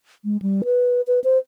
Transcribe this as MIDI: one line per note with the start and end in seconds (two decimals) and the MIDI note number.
0.25 0.37 56
0.42 0.62 55
0.65 1.01 71
1.07 1.20 71
1.24 1.38 72